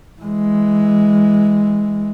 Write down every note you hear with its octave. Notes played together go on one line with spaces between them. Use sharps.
E3 G#3